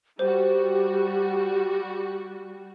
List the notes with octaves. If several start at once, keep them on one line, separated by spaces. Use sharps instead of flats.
G3 F#4 G4 C5